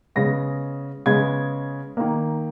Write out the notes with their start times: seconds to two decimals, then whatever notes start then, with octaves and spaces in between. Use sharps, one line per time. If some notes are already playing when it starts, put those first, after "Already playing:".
0.16 C#3 G#3 B3 A#6
1.06 C#3 G#3 B3 G#6
1.97 D#3 A#3